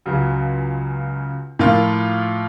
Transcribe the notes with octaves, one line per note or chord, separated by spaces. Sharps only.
C#2 C#3 F#3
A2 F3 A#3 F4